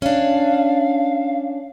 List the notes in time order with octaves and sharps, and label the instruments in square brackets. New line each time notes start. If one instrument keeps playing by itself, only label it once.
[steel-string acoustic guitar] C#4 D4 [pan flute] F5